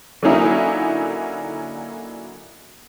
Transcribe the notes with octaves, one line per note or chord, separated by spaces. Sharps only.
D3 F#3 A#3 C#4 D#4 E4